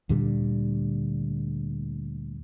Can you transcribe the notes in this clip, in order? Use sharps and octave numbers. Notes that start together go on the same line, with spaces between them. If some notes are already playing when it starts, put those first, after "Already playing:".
D2 A#2 D3 G3